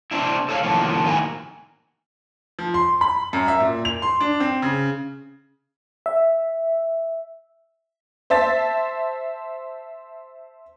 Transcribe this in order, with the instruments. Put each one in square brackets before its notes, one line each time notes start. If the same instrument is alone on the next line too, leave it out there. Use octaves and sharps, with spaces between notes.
[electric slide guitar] C4 D4 E4
A4 C#5 D#5 F5
A2 D#3 F3 A#3 B3
G#2 D#3 A#3 E4 F#4 G#5
[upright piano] F3
C6
B5
F#2
E5
A#2
F7
C6
D4
C4
C#3
[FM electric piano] E5
[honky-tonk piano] C5 E5 A5 A6